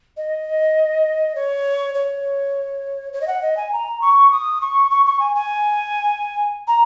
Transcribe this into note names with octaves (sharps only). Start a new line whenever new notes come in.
D#5
C#5
C#5
C#5
D#5
F#5
D#5
G#5
A#5
C#6
D#6
C#6
C#6
C#6
G#5
G#5
A#5